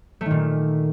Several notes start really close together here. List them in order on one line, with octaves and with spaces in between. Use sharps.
A3 D#3 A#2